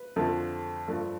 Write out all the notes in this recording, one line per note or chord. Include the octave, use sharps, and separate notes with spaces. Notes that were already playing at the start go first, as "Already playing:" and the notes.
Already playing: B4
F2 D3 F3 A3
G2 F3 A3